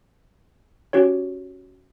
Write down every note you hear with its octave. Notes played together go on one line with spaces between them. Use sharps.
C#4 F#4 G4 C#5